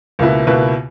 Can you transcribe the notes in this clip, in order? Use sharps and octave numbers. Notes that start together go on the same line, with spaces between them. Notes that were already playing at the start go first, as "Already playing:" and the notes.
C#2 B2 A#3 E4 B4
C#2 B2 A#3 E4 B4